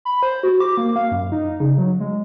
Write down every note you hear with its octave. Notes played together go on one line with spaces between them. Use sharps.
B5
C5
F#4
D6
A#3
F5
F#2
D#4
C#3
F#3
G#3